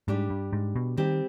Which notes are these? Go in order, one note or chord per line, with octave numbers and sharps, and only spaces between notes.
G#2 G3 D4 G4
G2
G#2
B2
D#3 G3 C4 G4